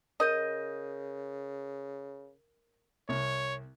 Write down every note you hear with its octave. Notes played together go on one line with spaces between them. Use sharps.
C#3 A#4 D#5 G6 D#7
C2 C#5